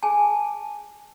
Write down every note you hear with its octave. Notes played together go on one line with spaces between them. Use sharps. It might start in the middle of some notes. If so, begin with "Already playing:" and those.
G#4 G#5 A5